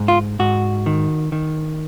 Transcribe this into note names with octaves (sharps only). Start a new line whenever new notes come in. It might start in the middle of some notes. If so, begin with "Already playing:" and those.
Already playing: G#2
F4
G#2 F#4
D#3
D#3